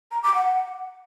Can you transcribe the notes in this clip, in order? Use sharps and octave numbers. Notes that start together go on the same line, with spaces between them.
A#5
D6
F#5